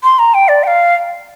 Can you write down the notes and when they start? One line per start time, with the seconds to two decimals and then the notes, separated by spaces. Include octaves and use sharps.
0.03 C6
0.19 A#5
0.34 G5
0.48 D5
0.64 G5
0.67 F5